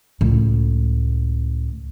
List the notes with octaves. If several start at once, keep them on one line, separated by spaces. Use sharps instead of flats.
C#2 A2